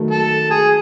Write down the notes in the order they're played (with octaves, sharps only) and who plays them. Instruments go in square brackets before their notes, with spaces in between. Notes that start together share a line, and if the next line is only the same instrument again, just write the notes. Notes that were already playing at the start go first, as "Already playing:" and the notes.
Already playing: [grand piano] D#3 F#3 A3
[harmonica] A4
G#4